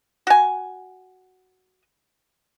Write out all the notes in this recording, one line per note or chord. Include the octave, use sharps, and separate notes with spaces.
F#4 G#5